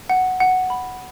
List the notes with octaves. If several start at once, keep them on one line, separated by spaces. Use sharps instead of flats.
F#5
F#5
B5